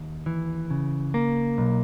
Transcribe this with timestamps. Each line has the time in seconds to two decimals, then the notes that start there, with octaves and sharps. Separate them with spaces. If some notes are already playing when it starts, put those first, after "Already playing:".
Already playing: D#2
0.26 E3
0.71 C#3
1.14 A#3
1.58 B1